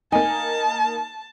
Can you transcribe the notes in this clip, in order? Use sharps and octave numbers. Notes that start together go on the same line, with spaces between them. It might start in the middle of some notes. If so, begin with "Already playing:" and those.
A#3 D#4 G#5 A5